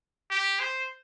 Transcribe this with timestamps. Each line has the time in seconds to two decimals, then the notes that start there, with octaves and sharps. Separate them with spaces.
0.31 G4
0.60 C5